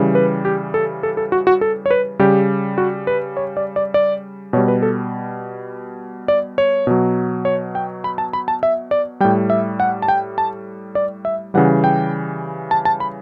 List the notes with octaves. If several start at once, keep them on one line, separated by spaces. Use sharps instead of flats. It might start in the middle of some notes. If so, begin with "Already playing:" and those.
Already playing: C#3 E3 G3
B4
G4
A4
A4
A4
F#4
F#4
A4
C#5
B4
C#3 G3 G4
F#4
B4
C#5
D5
D5
D5
B2 G3 C#5
B4
A4
D5
C#5
B2 F#3
C#5
G5
B5
A5
B5
A5
E5
D5
A2 G3 G5
E5
F#5
A5
G5
A5
D5
E5
C#3 E3 G3 F#5
G5
A5
A5
B5